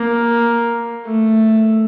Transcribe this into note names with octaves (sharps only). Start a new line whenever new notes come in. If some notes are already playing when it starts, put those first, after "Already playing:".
Already playing: A#3
A3